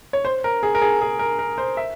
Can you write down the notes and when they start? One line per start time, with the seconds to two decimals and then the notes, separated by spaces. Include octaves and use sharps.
0.13 C#5
0.25 C5
0.44 A#4
0.63 G#4
0.75 A#4
0.82 G#4
1.01 G#4
1.19 A#4
1.39 A#4
1.58 C5
1.77 E5